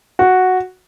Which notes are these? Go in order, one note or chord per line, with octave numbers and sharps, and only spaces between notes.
F#4